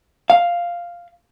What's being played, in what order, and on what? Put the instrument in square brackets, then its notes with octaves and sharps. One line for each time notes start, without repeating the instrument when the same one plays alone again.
[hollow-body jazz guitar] F5